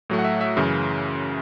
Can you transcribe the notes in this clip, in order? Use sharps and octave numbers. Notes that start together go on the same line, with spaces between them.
A2 F#3 A3
F#5
E5
E5
F#2 C#3 E3